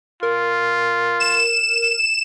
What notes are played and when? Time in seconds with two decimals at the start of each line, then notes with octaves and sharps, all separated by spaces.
0.23 F4 A#4
1.20 E7